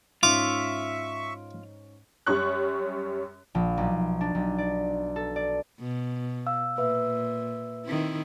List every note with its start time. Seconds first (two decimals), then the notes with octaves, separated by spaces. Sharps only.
0.23 G#2 C#4 D#4 F4 E5 C#6 D6
2.26 F#2 G3 C#4 C#6 F#6
3.55 A#1
3.77 B1
4.21 D4
4.35 B1
4.58 D5
5.16 A4
5.36 D5
5.80 B2
6.47 F5 E6
6.78 A#2 B4 E5 E6
7.86 D#3 C4 E4